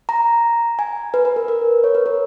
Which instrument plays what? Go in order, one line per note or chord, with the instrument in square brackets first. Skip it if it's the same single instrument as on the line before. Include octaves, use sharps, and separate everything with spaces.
[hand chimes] A#5
G#5
B4
B4
A#4
A#4
C#5
B4
A#4